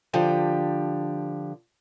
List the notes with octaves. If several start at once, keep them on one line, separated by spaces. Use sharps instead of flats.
D3 F3 G4